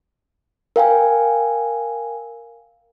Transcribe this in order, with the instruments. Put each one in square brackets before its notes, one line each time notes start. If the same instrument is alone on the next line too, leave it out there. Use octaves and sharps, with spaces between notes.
[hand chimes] A#4 F5 G5 G#5